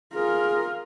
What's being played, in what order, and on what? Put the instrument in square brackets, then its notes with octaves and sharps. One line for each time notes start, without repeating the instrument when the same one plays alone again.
[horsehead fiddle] F4 A#4 [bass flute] G#4